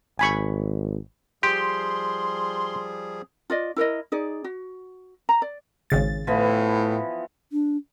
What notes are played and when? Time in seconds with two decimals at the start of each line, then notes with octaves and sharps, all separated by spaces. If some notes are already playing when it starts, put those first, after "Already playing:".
0.19 G#1 G#5 B5 C#6
1.43 F3 G3 G4 G#4 C6
3.50 F4 D5 D#5
3.76 E4 A#4 C#5 D#5
4.12 D#4 G#4 D5
4.44 F#4
5.29 A#5
5.42 D5
5.90 G#1 C#3 A6
6.27 A2 E3 F3 B3
7.52 D4